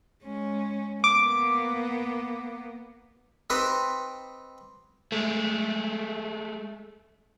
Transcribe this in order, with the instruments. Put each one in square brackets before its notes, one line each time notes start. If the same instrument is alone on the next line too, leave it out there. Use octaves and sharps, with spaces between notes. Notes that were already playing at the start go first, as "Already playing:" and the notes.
[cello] G#3 C#4
[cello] A#3 B3 [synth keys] D6
[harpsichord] C4 D#4 G4 B4 C5
[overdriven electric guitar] G#3 A3